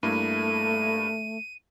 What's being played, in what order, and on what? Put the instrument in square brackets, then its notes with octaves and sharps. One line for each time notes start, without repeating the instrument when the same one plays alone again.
[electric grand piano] G2 A#3 E4 [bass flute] A3 [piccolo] D#7